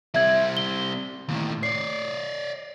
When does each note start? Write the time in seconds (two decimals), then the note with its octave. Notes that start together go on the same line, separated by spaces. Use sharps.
0.14 G3 C4 E5 G#6 F#7
0.57 G7
1.29 D#2 A2
1.63 C#5 D5 C7